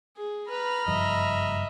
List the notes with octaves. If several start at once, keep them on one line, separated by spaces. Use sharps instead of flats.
G#4
B4 A#5 B5 F6
F#1 G2 F3 D#5 E5